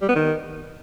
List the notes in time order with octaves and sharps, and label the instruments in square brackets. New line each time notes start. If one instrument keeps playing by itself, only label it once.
[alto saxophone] G3
B3
D#3